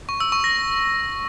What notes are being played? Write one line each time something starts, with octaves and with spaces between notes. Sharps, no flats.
C#6
E6
C#6
A#6